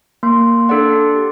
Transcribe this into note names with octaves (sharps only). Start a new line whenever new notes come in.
A#3 C6
D4 A4 D5 F#5
G4